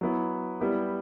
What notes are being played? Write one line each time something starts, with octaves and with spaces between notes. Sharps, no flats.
F#3 B3 E4
G3 B3 E4 G4